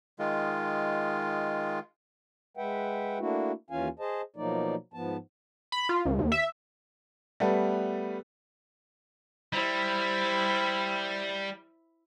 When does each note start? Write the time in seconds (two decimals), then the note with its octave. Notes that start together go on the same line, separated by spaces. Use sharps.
0.19 D#3 G#3 F4
2.57 G#3 B4 E5 F#5 G5
3.20 A3 A#3 D4 E4 F#4
3.70 D#2 E3 C#4 F4 F5 G#5
3.99 G#4 C5 D#5 A5
4.36 B2 F3 F#3 A#3 D#4 D5
4.94 G#2 F3 B3 A5
5.72 B5
5.89 F4
6.06 C#2
6.19 D#2
6.32 E5
7.40 G3 A3 B3 A4 B4
9.53 G3 E4 C5